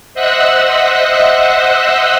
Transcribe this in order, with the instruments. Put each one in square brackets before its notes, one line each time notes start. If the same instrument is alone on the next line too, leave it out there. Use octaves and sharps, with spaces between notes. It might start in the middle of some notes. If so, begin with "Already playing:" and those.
[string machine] C5 D#5 E5 F#5 E6 F#6